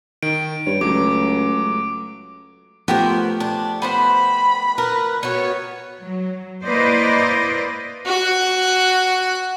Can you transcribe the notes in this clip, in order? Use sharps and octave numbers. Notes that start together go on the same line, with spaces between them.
D#3 D7
G2 C#5
C#2 F#3 A3 D6
F3 A3 B3 G4 A#4 C5
D4
B3 C5 F#5 B5
A#4 B4
B3 F#4 C#5
F#3
A#3 E4 B4 C5 D5 D#5
F#4 F#5